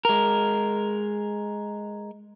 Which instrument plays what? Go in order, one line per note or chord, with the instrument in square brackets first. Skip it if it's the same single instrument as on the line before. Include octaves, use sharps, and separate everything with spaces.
[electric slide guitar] G#3 A#4